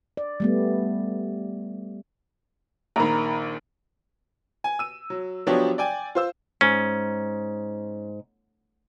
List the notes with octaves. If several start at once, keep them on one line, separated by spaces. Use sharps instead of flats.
D5
G3 A3 B3
A#1 D#3 A#5 B5
G#5
E6 D#7
F#3
F3 F#3 B3 D4 G4 C#5
D5 G5 G#5
F4 C5 E6
G#2 C#4